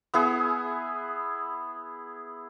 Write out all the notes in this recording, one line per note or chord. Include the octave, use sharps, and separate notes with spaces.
B3 E4 G#4